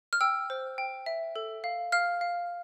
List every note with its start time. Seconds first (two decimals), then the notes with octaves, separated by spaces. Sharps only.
0.13 F6
0.21 G5 E6
0.50 C5
0.78 G5
1.06 E5
1.36 A4
1.64 F5
1.92 F5 F6
2.21 F5